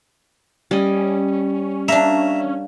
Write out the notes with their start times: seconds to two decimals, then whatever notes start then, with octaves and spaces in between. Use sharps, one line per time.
0.71 G3 C#4 D#5
1.88 A#3 D4 E5 A#5